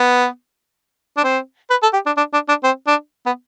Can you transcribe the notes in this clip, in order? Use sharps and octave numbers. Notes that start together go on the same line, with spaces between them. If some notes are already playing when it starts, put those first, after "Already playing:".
Already playing: B3
D4
C4
B4
A4
G4
D4
D4
D4
D4
C4
D4
B3